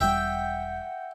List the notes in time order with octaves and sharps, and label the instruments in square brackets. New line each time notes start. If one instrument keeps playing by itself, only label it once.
[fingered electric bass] E1 G3 [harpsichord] E5 G5 [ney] F#5